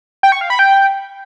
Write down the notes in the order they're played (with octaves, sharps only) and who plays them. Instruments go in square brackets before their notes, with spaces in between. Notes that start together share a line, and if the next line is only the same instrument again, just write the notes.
[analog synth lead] G5
C#6
F5
B5
G5